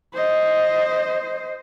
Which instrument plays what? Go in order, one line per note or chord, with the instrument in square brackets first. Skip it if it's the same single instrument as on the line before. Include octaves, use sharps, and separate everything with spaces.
[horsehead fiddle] C5 D#5